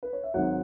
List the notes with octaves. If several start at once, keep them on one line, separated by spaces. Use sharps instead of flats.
B4
C#5
E5
G#1 G#2 F#3 C#5 F#5